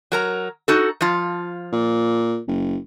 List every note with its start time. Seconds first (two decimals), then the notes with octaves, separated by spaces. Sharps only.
0.12 F#3 A#4 A#5
0.68 D#4 F#4 A4
1.01 F3 F4
1.72 A#2
2.48 F#1